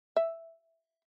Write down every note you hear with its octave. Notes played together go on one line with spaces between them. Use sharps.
E5